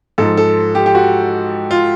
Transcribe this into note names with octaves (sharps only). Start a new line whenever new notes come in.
G#2 F3 A4
A4
G4
G4
F#4
F4